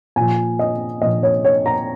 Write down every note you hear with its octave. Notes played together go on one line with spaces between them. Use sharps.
A#2 F3 G#5
D#5
A#2 F3 D#5
C#5
C#5
A#5